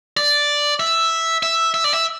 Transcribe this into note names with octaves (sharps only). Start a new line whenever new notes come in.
D5
E5
E5
E5
D5
E5